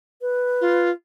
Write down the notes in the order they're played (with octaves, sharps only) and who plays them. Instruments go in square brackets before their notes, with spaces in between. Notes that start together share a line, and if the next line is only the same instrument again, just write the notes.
[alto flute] B4
[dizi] F4